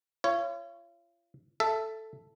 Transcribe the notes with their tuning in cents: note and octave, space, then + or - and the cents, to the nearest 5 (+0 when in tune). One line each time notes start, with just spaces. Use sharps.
F4 -40 C#5 +0
A4 +0 E5 +10